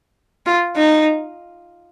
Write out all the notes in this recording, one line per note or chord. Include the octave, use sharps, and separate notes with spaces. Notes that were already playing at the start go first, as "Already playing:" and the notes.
F4
D#4